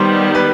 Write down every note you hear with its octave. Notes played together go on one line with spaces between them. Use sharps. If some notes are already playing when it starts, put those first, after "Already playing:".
Already playing: D#3 G3 B3 C5
B4